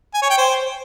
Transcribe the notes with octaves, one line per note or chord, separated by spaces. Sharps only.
G#5
C#5
G5
C5